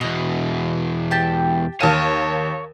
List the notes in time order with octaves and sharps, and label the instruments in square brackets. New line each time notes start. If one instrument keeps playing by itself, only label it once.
[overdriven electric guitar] E2 B2 [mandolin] D#5
[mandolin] G4 G5 A5
[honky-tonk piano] D#2 A5 D#7 [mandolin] A#4 F5 [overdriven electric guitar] C#5